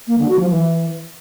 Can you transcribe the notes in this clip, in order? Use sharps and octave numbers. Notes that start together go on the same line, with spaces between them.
A#3
D3
F#4
F3
E3